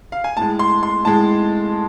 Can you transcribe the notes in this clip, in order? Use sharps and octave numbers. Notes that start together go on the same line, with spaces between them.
F5
G#5
A2 G#3 A5
C6
C6
A2 G#3 A5